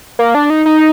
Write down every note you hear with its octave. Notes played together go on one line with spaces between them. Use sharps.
A#3
D4
D#4
D#4